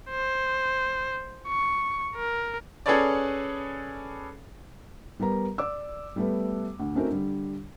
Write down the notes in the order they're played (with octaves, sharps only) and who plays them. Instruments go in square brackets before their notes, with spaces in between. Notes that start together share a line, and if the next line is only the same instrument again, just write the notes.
[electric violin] C5
C#6
A#4
[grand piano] C#4 G#4 A4 B4 C#5 D5
[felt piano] G3 B3 A#4 A#5
D5 D6 E6
G3 A3 B3
D2
A3 C4 C#4 D#4 F#4 A#4
D3 G3